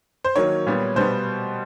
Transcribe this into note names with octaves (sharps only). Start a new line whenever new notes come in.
C5
D#3 F#3 A#3 C#5
A#2 G3 B3
B2 G3 B3 C5